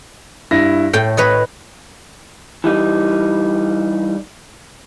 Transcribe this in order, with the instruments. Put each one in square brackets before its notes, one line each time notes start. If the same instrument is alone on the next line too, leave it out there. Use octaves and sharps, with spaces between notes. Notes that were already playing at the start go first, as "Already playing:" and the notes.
[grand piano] G2 E4 A#6
[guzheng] A2 G5 [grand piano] A3
[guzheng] B4 C#5 D#5
[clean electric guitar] E3 G3 D#4